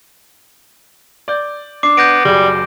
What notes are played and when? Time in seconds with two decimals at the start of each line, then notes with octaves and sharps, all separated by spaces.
1.28 D5 G6
1.83 D4 D6 C7
1.97 B3 G6 A#6 D7
2.25 F#1 F#3 G3 G#4